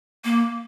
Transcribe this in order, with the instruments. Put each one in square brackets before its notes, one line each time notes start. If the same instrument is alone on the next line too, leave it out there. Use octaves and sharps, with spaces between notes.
[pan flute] A#3